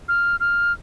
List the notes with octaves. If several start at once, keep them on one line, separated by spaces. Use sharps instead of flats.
F6
F6